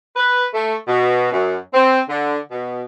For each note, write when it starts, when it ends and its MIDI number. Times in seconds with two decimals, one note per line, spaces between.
0.16 0.45 71
0.54 0.76 57
0.88 1.28 47
1.32 1.57 42
1.73 2.00 60
2.08 2.38 50
2.51 2.83 47